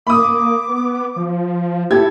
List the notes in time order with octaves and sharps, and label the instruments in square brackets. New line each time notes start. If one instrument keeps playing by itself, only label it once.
[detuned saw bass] A#3 [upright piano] B5 D#6 [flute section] D6
[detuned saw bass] A#3
B3
F3
[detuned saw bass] E4 [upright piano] G4 G#6 [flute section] A4